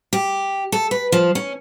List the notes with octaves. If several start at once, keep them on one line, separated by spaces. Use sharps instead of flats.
G4
A4
B4
F3
C#4